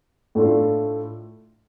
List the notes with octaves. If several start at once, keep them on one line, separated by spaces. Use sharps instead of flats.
A2 A3 D4 F4